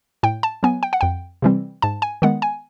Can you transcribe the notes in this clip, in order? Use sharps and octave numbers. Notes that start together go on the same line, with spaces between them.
A2 G5
A5
F#3 B3 G#5
G5
F#5
F2 G5
C3 E3 G3 C4
G#2 A5
G#5
D#3 G#3 B3 F#5
G#5